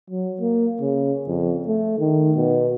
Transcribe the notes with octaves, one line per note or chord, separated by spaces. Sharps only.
F#3
A#3
C#3
F2
A3
D#3
B2